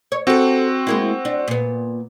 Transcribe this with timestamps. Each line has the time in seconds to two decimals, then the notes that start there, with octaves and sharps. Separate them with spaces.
0.12 C#5
0.27 C4 F#4 G4 A4
0.87 G#3 A#3 E4
1.25 D4
1.48 A#2 B3